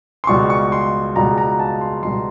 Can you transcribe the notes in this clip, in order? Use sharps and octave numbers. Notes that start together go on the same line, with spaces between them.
C6
C#2 B2 G3 C#6
C#6
C6
C#2 B2 G3 A#5
A#5
A5
C6
C#2 B2 G3 C6